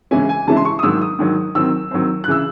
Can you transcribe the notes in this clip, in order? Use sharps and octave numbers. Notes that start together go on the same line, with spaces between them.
C#3 E3 G#3 C#4 E4 G#5
G#5
C#3 E3 G#3 C#4 E4 A5
C6
C#6
D#6
G#2 D#3 F#3 E6
D#6
G#2 D#3 F#3
D#3 F#3 C4 E6
D#3 F#3 C4
F#6
C#3 E3 E6